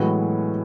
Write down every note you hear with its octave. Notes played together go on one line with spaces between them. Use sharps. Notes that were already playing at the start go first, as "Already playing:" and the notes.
Already playing: A2 E3 F#3 G#3 B3 F#4